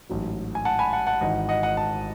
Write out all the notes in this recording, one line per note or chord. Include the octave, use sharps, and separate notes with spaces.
A1 G#2 F#3
G#5
F#5 A5
G#5 B5
F#5 A5
F#5 A5
G#1 G#2 E3 D#5 F#5
D#5 F#5
D#5 F#5
F#5 A5